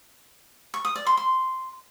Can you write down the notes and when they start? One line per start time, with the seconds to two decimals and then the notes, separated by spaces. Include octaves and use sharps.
0.74 C#6
0.85 D#6
0.96 D5
1.06 C6
1.17 C6